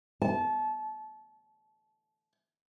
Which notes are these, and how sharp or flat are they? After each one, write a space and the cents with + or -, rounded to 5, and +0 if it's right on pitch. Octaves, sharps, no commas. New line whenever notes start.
A5 -25